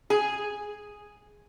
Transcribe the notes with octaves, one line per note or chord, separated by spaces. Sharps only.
G#4